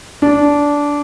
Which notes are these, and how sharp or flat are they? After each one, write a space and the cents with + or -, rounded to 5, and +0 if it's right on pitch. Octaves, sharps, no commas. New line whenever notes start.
D4 -15